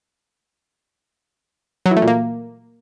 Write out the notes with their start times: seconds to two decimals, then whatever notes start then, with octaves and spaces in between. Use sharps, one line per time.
1.86 F#3
1.91 E3
1.97 A3
2.02 A#2
2.08 A#3